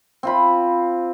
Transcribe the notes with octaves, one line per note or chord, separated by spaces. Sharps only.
C4 F4 B5